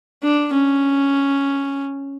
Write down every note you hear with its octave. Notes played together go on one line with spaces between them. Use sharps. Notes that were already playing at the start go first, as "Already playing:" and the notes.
D4
C#4